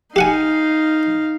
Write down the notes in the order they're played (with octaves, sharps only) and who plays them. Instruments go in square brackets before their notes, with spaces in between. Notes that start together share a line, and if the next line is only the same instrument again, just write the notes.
[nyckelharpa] D#4 F5 [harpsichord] G4 F#5 G#5